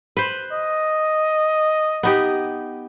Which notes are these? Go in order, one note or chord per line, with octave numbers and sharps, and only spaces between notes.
B4 C5
D#5
B3 D#4 G4